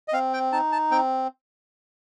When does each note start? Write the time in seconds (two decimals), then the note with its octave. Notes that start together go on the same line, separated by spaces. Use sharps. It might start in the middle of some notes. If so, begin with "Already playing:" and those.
0.08 D#5
0.13 C4 F5
0.33 G5
0.52 D#4 A5
0.72 A5
0.91 C4 G5